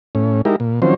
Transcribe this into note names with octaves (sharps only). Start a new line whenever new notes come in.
A2 C#4
G#3 D#4 E4 G4 A#4
A#2
D#3 F3 F#3 C4 C#4 C5